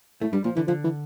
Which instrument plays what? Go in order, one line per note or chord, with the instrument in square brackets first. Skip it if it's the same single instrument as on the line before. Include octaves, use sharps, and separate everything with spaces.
[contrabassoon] A2 [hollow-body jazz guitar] A3
[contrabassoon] G2 [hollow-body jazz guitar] G3
[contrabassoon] A#2 [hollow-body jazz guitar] F3
[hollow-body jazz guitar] D3 [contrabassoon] E3
[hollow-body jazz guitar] D3 [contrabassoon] F3
[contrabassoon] E3